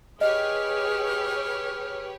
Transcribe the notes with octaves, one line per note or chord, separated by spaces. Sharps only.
G4 G#4 B4 C#5 D#5 F6